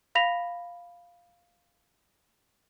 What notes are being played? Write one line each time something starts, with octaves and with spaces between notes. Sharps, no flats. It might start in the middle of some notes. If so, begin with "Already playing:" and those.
F5 B5 A#6 B6 F7